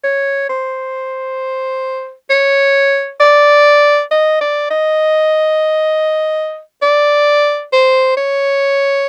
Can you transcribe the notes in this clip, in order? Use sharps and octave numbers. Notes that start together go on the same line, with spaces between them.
C#5
C5
C#5
D5
D#5
D5
D#5
D5
C5
C#5